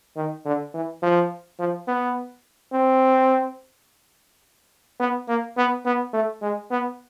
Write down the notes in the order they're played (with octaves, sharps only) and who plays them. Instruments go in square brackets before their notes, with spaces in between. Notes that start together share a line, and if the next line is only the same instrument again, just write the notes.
[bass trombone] D#3
D3
E3
F3
F3
B3
C4
B3
A#3
B3
B3
A3
G#3
B3